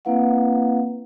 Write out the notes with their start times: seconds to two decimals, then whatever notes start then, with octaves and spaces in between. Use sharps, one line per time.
0.05 A#3 C4 E4 B4 F5 F#5